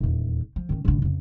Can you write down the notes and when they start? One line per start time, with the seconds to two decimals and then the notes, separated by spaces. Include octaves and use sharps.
0.01 D#1 E2
0.56 F3
0.69 D#3 C#4
0.85 A1 D3
1.02 F2 C#3